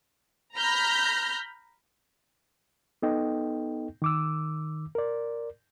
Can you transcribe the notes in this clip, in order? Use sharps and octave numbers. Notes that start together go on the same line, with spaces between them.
A#5 B5 F6 G6 A#6
B3 D#4 A4 D#5 G5
D#3 D6 E6
A#4 D5